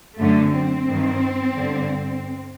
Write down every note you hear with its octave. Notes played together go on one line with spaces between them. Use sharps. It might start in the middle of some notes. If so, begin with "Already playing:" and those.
F#2 D3 A3
C4
G2 D#3
G2 D3